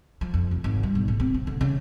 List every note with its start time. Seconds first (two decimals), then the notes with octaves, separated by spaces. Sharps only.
0.21 F3
0.34 F2
0.51 F1
0.64 G#1
0.83 G3
0.95 B1
1.08 A2
1.20 C4
1.34 C#3
1.47 D3
1.61 C#3